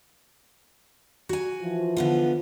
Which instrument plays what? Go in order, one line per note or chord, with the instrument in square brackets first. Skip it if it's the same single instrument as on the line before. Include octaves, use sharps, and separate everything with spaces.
[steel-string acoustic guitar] F#4 G#5
[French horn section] E3 F3
[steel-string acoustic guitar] D3 B3 F4